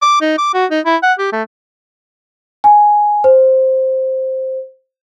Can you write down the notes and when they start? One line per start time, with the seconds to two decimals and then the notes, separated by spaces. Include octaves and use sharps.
0.02 D6
0.21 D#4
0.38 D6
0.54 F#4
0.71 D#4
0.86 E4
1.03 F#5
1.19 G4
1.32 A3
2.64 G#5
3.24 C5